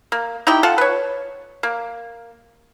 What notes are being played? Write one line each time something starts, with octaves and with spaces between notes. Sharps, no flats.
A#3
D#4 E4 G4 G5
F4 A4 F#5 A5
B4 C#5
A#3